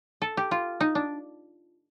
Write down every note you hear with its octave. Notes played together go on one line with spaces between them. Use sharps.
A4
G4
F4
D#4
D4